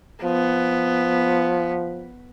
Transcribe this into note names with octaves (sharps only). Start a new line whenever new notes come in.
F3 B3